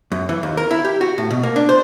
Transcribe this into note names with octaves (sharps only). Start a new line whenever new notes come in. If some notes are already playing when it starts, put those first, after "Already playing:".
F#2
E3
D#2
A#4
E4
G4
F#4
A2
B2
A#3
D4
C5